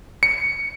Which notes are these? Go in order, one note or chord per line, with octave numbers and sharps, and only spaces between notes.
C#7